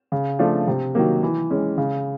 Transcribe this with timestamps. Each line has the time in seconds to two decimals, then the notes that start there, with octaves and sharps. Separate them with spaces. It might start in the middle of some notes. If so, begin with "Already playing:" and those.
0.12 C#3
0.39 F3 A3 D4 F4
0.68 C3
0.95 D#3 F#3 A#3
1.23 E3
1.50 G#3 C#4
1.78 C#3